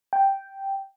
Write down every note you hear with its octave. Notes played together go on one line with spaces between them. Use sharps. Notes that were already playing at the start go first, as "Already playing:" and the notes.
G5